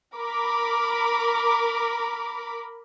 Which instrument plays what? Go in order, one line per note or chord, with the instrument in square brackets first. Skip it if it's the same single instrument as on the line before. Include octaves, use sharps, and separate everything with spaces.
[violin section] A#4 B5 D6